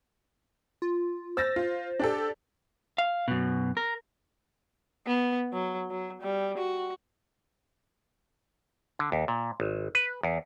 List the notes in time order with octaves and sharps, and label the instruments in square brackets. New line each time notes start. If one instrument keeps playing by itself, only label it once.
[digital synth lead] F4
[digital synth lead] C5 [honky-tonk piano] E6 A6 A#6
[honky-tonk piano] F4
D4 G4 A4
[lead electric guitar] F5
F#2 B2
A#4
[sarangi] B3
F#3
F#3
G3
F#4
[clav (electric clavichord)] D3
D#2
A#2
G#1
B4
E2